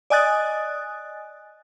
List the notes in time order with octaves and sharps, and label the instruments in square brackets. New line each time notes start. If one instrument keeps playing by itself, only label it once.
[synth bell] D5 D#5 G#5 D#6 F#6 A6